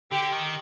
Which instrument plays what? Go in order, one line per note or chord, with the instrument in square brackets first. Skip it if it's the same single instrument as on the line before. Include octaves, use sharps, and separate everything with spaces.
[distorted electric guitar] D3 [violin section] G4
[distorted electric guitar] D#3